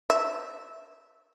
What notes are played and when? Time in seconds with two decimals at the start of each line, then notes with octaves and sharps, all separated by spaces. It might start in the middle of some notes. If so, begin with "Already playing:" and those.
0.10 E5